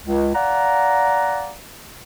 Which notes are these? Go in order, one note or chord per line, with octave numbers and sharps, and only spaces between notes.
C#2
D5 F5 F#5 A#5